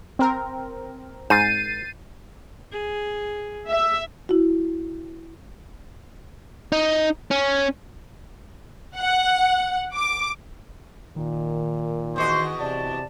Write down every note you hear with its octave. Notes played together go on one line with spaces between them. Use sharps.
C4 A#4
G#2 G6 A6 C7 D#7
G#4
E5
E4 F#4
D#4
C#4
F#5
D6
A#2 D#3
E2 F#4 C5 D#5
C3 D5 A5